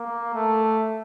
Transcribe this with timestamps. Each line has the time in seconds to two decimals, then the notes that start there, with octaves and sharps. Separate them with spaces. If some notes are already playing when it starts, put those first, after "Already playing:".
Already playing: A#3
0.34 A3